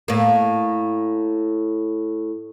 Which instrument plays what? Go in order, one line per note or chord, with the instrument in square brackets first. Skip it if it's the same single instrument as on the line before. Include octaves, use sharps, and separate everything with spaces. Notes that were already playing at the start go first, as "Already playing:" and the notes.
[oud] A2 A#3